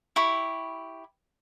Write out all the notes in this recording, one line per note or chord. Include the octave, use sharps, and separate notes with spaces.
E4 G4 B5 C#6